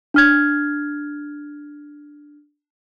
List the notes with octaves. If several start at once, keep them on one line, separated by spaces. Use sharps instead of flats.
D4 F6 G#6